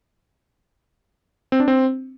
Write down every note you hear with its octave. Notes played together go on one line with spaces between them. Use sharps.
C4
D4
C4